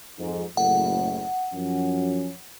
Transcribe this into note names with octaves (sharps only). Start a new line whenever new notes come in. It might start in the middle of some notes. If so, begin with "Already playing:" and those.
F2 G#2
F#1 A2 F#5
F#2 F3 C#4